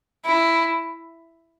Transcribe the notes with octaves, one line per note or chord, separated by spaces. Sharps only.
E4